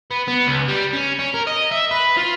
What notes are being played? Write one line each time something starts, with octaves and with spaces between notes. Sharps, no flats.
B3
B3
C#2
G3
C#4
C#4
A#4
D#5
E5
B4
F4